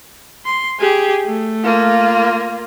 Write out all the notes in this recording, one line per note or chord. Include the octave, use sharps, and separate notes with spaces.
C6
G4 G#4
A3
A#3 F4